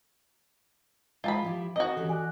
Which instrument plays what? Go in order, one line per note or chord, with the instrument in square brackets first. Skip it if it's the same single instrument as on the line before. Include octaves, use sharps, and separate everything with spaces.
[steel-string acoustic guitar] G#3 [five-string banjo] F4 A5 B5
[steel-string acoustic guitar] F3 E4 G4
[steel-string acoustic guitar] C4 E4 A#4 [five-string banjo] F#4 D#5
[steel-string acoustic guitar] E3 C#4 G4 [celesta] A4
[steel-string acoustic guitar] D5 [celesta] G#5 F#6